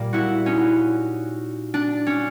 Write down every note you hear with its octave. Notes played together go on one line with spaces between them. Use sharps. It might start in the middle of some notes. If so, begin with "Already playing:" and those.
Already playing: A#2 G3 A#3
E4 F#4
C#4 D#4
D4
C#4